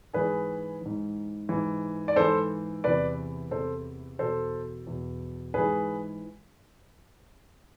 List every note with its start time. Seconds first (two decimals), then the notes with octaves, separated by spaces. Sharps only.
0.13 G#2 E3 G#4 B4
0.82 G#2 E3
1.49 G#2 E3
2.08 D5
2.16 G#2 E3 A4 C5
2.84 E2 C3 E3 B4 D5
3.51 E2 C3 E3 A4 C5
4.19 E2 B2 A4 C5
4.87 E2 B2
5.54 G#2 E3 G#4 B4